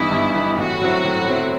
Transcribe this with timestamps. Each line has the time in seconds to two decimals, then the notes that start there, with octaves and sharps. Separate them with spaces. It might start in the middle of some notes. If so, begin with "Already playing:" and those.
Already playing: G2 E3 B3 D#4 E4
0.11 G2
0.34 E3 B3 D#4
0.58 A2 F#4
0.82 F#3 C4 E4
1.04 A2
1.27 F#3 C4 E4